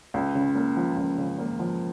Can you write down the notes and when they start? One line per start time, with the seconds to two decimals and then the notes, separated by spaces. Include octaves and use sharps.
0.14 C#2
0.35 C#3
0.55 A#3
0.77 F3
0.97 C#2
1.18 C#3
1.38 A#3
1.59 F3